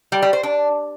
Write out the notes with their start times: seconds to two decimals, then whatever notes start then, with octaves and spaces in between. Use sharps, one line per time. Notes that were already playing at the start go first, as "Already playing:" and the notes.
0.12 G3
0.22 G3
0.33 C5
0.43 D4